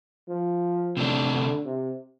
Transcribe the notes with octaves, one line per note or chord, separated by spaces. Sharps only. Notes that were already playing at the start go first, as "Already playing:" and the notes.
F3
C3 A3 D4
D3
C3